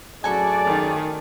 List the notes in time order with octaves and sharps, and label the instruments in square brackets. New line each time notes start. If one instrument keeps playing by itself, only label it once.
[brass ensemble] F#2 G#4 D5 [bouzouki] A2 A4 G#5 [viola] F#4
[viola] D#3